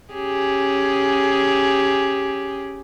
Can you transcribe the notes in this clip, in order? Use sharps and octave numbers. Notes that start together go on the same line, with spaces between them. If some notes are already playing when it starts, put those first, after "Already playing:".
C#4 G4 G#4